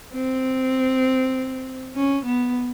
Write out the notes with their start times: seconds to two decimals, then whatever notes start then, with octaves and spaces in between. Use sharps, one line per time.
0.13 C4
1.95 C#4
2.25 B3